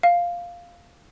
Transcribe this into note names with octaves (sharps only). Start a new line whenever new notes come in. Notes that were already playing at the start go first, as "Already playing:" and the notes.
F5